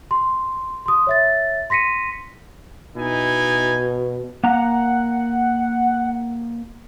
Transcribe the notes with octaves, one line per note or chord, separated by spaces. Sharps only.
C6
C6 D#6
C#5 E5 A6
C6 A#6 B6 C#7 D#7
B2 D#4 E4 G#5
A#3 F#5 A#5